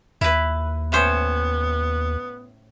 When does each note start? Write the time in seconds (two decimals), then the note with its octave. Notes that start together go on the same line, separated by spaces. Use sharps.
0.21 D#2 E4 B4
0.92 A2 B3 C#4 C5